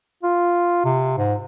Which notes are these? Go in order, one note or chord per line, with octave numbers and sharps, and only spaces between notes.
F4
C3
G#2